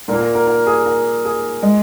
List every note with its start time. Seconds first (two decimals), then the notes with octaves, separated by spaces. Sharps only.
0.08 A#2 A#4
0.12 A#3
0.21 A#4
0.35 A#4
0.47 A#4
0.66 G#4
0.85 A#4
1.25 G#4
1.62 G#3